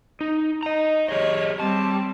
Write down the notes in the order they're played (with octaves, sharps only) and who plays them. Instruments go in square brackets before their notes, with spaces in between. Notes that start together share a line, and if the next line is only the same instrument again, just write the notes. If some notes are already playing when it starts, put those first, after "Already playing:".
[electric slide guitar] D#4
D#5 A#5
[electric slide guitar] G4 G#4 D#5 [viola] C#5
[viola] G3 C4 [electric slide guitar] A5